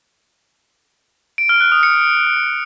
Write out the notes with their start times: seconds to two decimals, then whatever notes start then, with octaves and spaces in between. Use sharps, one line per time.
1.38 D7
1.49 F6
1.61 F#6
1.72 D#6
1.83 C#7